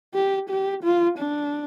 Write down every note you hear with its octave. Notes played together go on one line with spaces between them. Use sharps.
G4
G4
F4
D4